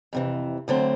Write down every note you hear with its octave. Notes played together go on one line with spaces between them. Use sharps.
F2 C3 E3
D2 D3 F#3 A3 C4